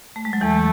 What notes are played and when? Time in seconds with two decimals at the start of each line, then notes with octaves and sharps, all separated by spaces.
0.16 A3
0.25 G#3
0.33 F#3
0.41 E2 E3 A3